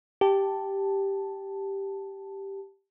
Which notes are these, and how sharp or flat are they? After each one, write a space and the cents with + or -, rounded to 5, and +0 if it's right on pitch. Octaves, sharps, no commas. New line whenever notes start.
G4 +0 A5 +0